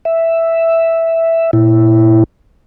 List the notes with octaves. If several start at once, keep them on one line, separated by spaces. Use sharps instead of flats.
E5
A#2 E4